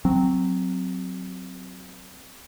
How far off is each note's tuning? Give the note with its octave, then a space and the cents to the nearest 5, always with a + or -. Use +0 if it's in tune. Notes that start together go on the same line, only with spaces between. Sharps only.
F#3 +0 C4 +0